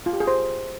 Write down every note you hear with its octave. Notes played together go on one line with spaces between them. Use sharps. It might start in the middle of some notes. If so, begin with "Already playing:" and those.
F4
G4
G#4
C5